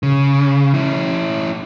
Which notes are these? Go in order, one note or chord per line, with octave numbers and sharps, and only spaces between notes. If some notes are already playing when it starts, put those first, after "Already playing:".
C#3
C#4 E4